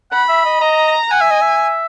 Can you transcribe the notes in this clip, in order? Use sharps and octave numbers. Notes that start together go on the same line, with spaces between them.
F#5 B5
E5
D#5
D#5 A#5
F#5 G#5
E5
D#5
E5